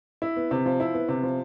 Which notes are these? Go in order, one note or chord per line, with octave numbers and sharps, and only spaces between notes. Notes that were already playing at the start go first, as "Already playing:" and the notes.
E4
B3
C3
F3
E4
B3
C3
F3